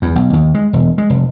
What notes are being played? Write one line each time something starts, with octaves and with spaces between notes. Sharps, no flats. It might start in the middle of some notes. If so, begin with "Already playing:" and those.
E2
B1
D#2
G#3
E1
G#3
F1